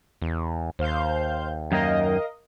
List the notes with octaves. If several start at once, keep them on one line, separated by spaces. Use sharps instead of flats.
E2
D#2 C5 F5 G6
F#2 D#3 A#3 A#4 D#5 F5